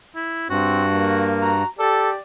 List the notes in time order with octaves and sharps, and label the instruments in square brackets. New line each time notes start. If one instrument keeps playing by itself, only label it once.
[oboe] E4
[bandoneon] G2 [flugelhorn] C4 [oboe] F#4
[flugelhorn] A#3
[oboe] F#4 [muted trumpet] A#5
[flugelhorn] G4 [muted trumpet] A4 [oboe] D5